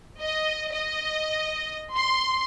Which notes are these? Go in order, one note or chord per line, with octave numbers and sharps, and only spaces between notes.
D#5
D#5
C6